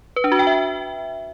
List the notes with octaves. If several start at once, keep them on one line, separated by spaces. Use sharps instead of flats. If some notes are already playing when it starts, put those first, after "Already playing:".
B4
D4
F#4
G5
E5